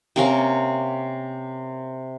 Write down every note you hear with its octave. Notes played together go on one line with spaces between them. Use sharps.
C3 A#3 C#4 C#6